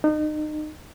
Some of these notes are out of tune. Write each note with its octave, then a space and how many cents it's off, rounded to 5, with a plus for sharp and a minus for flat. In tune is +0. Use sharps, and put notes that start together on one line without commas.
D#4 -35